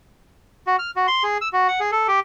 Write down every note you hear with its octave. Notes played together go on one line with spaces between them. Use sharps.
F#4
F6
F#4
C6
G#4
E6
F#4
F#5
G#4
A4
G4